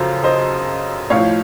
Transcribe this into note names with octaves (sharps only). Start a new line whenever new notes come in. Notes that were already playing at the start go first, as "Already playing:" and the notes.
Already playing: F#2 C#3 F3 A4 C5
C5 D#5
A2 F3 C#5 F5